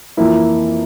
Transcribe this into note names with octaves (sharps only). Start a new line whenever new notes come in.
F2 E3 A#3 E4